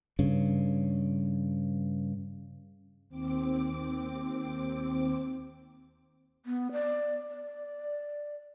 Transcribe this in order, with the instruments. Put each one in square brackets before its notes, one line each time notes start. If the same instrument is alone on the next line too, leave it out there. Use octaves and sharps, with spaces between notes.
[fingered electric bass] G2 C#3
[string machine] D#2 C4 D6
[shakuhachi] B3
D5
D5